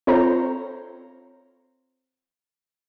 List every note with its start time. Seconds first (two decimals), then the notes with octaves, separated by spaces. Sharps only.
0.07 C4 F4 A4 C5 C#5 A#5